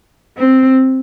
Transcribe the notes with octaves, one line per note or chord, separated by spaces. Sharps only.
C4